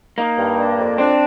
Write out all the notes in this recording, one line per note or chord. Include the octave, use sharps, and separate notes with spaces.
A#3 D#4
G2
D4
F2
C4 D4